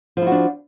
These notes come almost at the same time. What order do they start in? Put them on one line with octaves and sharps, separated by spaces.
F3 E4 F#4 D4